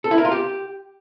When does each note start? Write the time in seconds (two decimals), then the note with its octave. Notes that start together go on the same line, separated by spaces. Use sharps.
0.04 A4
0.11 E4
0.18 A#4
0.25 F4
0.32 G4